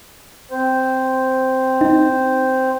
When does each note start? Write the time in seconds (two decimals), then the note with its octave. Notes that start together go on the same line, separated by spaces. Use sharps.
0.51 C4 C5
1.81 D#4